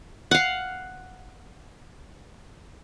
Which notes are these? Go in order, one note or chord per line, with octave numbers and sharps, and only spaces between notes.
F5 F#5